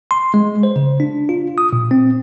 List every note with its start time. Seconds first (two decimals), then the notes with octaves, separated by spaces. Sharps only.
0.11 C6
0.34 G#3
0.63 C5
0.76 C#3
1.00 D4
1.29 F4
1.58 D#6
1.73 A#2
1.91 C4